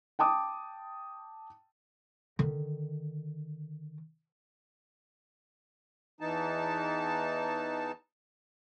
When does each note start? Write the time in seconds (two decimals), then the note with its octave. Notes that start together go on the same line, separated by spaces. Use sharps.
0.19 G5 A5 D6 D#6
2.39 D3 D#3
6.21 E2 E3 D#4 A5